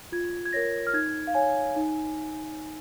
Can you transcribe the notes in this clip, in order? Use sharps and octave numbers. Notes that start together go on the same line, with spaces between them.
F4 G#6
G#6
A#4 C#5 A#6
F6
D#4 G#6
F5
C#5 G#5
D#4